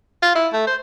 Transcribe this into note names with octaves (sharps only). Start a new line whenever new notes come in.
F4
E4
A3
C5